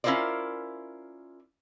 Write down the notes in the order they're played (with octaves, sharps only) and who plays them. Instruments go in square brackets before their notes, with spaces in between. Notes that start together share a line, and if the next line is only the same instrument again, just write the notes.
[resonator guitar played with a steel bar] C#4 E4 F4 A#4 C5 D5